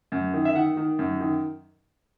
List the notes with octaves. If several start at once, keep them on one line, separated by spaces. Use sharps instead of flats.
F#2
D#3
E5
D#3 F#5
D#3
F#2
D#3